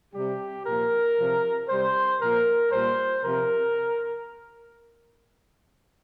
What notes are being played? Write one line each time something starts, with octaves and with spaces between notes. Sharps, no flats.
C3 G3 G4
A#2 F3 A#4
C3 F3
C3 G3 C5
A#2 F3 A#4
A#2 G3 C5
C3 F3 A#4